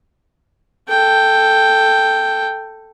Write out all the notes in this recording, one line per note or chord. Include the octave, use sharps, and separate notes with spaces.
A4 G5